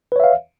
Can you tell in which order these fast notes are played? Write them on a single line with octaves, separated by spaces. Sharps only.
B4 C#5 E5 F5